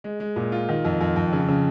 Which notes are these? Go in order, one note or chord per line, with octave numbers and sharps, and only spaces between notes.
G#3
G#3
A#2
F4
D#3
F2
F2
F2
C#3
C#3